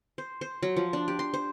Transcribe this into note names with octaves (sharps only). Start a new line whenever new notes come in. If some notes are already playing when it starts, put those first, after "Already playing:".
C5
C5
F#3
F3
D4
G4
C6
C5